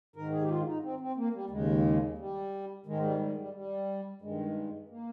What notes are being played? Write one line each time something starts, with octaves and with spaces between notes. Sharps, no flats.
G#2 D#3 A#4
G#4
G4
F4
D#4
C4
C4
A#3
G3
D#2 C#3 G#3
G3
G#2 D#3 G#3
G3
G3
G3
G3
G2 D#3 G#3
A#3